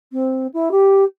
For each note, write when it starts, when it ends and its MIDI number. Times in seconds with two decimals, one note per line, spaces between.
0.12 0.47 60
0.54 0.69 64
0.71 1.04 67